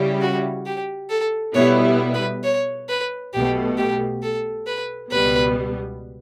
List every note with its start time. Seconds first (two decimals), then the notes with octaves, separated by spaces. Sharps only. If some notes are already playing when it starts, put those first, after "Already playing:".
Already playing: C#3 G3 C#4 E4 G4
0.22 F#4
0.66 G4
1.10 A4
1.54 B2 G3 B3 E4 C#5
2.15 B4
2.44 C#5
2.89 B4
3.33 B1 B2 A3 G4
3.78 G4
4.23 A4
4.67 B4
5.12 C#2 B2 G3 B3 B4